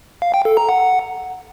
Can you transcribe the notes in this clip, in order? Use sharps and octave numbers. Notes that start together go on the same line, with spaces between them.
F5
G5
A4
A#5
F#5